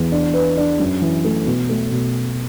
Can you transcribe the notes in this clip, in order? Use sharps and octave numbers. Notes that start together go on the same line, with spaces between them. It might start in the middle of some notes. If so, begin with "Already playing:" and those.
Already playing: E2
D4
B4
D4
F#2
E3
A3
B2
A3
B2